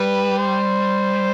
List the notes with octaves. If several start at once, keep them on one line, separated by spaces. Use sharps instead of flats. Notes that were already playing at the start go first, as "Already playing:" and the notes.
Already playing: G3 B4
C5